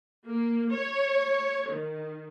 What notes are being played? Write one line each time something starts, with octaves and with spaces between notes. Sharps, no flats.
A#3
C#5
D#3